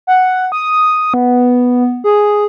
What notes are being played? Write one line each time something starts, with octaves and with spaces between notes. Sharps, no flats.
F#5
D#6
B3
G#4